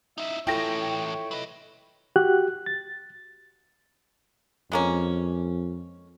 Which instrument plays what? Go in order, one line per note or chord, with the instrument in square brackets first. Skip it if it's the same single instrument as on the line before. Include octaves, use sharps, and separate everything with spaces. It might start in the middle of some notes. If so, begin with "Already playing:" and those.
[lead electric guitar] D#4 E4 [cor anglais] E5
[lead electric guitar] A2 E3 [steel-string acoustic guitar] E4 F4 A4 [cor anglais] C#5 [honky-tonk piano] G5 A#6
[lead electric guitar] F#3 D#5 [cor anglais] B4
[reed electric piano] F#4 G4 F#6
A6
[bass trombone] F2 [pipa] G#3 A#3 C#4